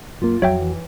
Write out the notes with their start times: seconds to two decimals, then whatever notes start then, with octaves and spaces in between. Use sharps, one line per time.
0.22 F#2 A#3 F4
0.42 F2 F#3 F#4 C#5 E5 G5
0.61 E3